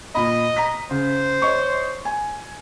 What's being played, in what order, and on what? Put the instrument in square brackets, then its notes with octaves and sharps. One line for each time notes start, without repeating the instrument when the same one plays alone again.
[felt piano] A#2 B5 [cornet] D#5
[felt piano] A#5 B6
[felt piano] C#3 [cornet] C5
[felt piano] C#5 D#5 C#6
G#5